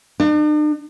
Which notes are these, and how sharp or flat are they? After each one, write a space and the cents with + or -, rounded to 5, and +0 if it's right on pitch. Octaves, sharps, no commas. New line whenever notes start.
D4 +45